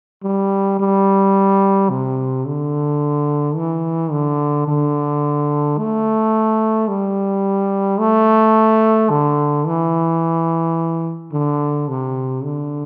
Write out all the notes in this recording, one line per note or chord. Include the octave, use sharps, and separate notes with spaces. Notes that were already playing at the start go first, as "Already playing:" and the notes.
G3
G3
C3
D3
E3
D3
D3
A3
G3
A3
D3
E3
D3
C3
D3